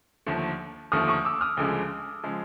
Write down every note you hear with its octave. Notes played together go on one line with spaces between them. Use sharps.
D#2 D3 F3 A3
D#2 D3 F3 A3 D#6 F6
C#6 D#6
D6 E6
D#6 F6
D2 C#3 F3 G#3
C#3 F3 G#3